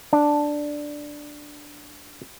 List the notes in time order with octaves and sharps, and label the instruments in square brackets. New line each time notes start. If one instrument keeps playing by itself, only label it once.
[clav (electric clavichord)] D4